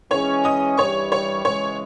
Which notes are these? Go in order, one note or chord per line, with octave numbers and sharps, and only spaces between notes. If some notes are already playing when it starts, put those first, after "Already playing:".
E3 G#3 C#4 G#4 C#5 C#6
D#5 D#6
G2 E3 G3 C#5 C#6
C#5 C#6
C#3 E3 G#3 C#5 C#6